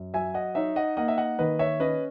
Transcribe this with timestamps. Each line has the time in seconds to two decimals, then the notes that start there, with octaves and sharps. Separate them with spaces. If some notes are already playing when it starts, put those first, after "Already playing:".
Already playing: F#2
0.14 F#3 E5 G#5
0.34 D#5 F#5
0.55 D#4 C#5 E5
0.76 D#5 F#5
0.97 A#3 D#5 F#5
1.08 E5
1.18 D#5 F#5
1.39 D#3 B4 D#5
1.59 C#5 E5
1.80 C#4 B4 D#5